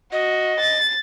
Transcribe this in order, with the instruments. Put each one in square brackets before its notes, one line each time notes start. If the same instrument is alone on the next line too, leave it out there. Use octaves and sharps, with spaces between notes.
[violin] F#4 [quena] D#5
[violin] A6